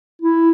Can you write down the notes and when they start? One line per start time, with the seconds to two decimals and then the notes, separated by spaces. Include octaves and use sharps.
0.22 E4